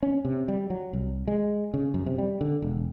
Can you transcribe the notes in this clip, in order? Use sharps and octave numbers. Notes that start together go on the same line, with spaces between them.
C#4
C3
G3
F#3
C2
G#3
C#3
F#2
C3
G3
D3
E1